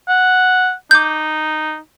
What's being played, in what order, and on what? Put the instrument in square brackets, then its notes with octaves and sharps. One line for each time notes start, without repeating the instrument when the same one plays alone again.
[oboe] F#5
[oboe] D#4 [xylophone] D6 G6